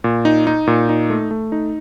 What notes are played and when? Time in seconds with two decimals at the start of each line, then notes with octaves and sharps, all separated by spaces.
0.04 A#2
0.25 D#4
0.47 D#4
0.67 A#2
0.89 D#4
1.10 A3
1.31 A3
1.52 D#4